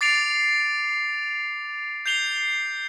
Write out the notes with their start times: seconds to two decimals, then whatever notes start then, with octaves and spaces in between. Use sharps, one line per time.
0.01 D6 A6 C7 D7 F7
2.06 G6 C7 F7 G7